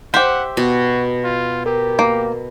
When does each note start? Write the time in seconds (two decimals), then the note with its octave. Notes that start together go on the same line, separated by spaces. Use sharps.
0.14 G4 C5 E5 F#5
0.57 B2 F#4
1.24 F4
1.66 G4 A#4
1.99 A#3